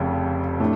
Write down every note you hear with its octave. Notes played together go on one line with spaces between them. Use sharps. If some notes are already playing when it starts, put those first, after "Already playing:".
Already playing: F1 F2 C#3
A2 A3 D4